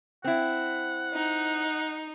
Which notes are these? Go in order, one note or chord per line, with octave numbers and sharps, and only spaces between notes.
C4 E4 F#5
D#4